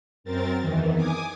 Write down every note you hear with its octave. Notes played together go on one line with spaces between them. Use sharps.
F#2 C4 A#4 A6
E2 D#3 E3
G#5 D6 D#6